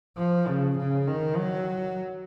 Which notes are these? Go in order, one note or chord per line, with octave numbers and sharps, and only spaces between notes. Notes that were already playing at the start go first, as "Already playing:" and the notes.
F3
C#3
C#3
D#3
F#3